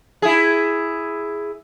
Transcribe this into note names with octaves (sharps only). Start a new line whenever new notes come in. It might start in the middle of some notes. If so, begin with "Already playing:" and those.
E4 G#4